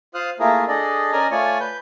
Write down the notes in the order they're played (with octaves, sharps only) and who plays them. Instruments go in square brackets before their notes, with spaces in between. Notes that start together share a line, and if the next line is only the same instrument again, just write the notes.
[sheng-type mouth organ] F4 C5 F5 D#6 F6 F#6
A3 A#3 E4 F4 G#4 A#4
D4 G#4 A4 D5 D#5
C#4 A#4 D5 D#5 G#5 A#5
A3 F4 C#5 D5 G#5 C#6
B4 G6